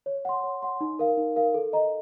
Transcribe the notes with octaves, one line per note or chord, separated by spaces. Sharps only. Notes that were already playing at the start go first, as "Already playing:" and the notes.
C#5
F#5 C6
C#5
F#5 C6
D#4
A#4 F5
D#4
A#4 F5
A4
D#5 A#5